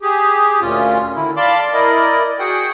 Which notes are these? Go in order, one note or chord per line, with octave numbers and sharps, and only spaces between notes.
G4 G#4
D2 A#2 C#4 F4
D3 D#3 E4
D5 F5 A5 B5 C6 D6
E4 A#4 D5 D#5
F#4 G#4 F#5 G5